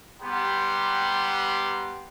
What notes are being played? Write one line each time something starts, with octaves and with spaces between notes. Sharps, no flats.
G3 B3 G4 F#5 A#5 C6